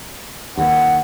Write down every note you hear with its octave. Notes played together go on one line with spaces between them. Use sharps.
D#2 F#5